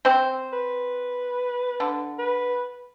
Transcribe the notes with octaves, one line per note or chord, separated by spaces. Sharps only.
C4 C5
B4
D3
B4